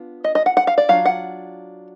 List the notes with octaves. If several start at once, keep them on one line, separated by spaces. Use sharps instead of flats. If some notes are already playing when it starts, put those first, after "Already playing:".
Already playing: B3 D4 F4
D#5
D#5
F#5
F#5
F5
D5
F#3 D4 F4 F5
F#5